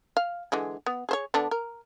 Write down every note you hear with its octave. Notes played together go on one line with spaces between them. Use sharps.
F5
D3 E3 G#3
B3
G#4 C5 C#5
D3 B3 D4
A#4